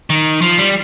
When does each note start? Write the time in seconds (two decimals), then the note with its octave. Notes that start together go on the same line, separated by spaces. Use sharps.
0.10 D#3
0.42 F3
0.58 G3